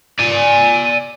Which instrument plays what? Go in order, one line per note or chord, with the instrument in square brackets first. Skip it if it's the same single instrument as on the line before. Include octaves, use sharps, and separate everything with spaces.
[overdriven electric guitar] D5 G#5